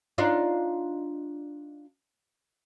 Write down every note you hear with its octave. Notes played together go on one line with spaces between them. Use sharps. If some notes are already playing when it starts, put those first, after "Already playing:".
D4 D#4 F4